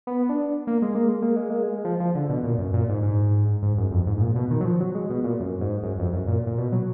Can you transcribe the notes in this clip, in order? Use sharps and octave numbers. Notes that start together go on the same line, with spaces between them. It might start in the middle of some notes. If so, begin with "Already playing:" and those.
B3
D4
A#3
G#3
A#3
G#3
A#3
G#3
A#3
G#3
F3
F3
D3
B2
A#2
F#2
A#2
G#2
G#2
G#2
F#2
F2
G#2
G#2
A#2
B2
D#3
F#3
F3
F#3
G#3
B2
A#2
F#2
G#2
F#2
F2
F#2
A#2
A#2
B2
F#3